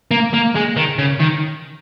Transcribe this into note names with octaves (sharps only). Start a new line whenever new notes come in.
A#3
A#3
G#3
D#3
C#3
D#3